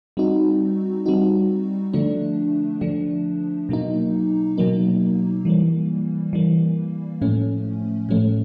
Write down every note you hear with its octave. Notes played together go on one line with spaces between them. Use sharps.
G3 C4 D#4 F#4
G3 C4 D#4 F#4
D3 F3 A3 D4
D3 F3 A3 D4
B2 F#3 A#3 D#4
B2 F#3 A#3 D#4
E3 G3 A#3
E3 G3 A#3
A2 F3 A3 C#4
A2 F3 A3 C#4